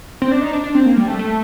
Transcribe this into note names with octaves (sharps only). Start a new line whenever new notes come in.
C4
D4
D#4
D4
D4
C4
A#3
G3
A3
A3